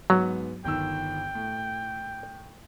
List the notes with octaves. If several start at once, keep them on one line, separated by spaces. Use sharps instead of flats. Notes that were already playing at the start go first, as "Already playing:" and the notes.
G#2 F#3 B3 F#4
G1 D#3 G5 E6
A2